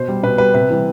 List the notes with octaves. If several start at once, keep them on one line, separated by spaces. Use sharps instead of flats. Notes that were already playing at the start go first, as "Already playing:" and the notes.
Already playing: B2 C5
G3
B2 B4
G3 B4
C3 B4
E3 G3